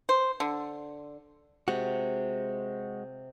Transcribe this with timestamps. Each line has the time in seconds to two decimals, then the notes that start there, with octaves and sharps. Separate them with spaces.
0.09 C5
0.40 D3
1.68 C3 G#3 F#4